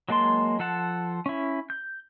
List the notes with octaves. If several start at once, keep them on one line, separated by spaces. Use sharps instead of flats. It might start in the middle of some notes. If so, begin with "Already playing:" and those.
F#3 G#3 A#3 A5 C6
F3 A4 F#5 A5
C#4 E4
G6